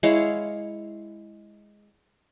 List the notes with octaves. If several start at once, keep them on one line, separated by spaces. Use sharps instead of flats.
G#3 E4 C#5 F5